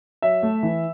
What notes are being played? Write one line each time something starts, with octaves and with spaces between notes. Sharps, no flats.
F#3 E5
A3
E3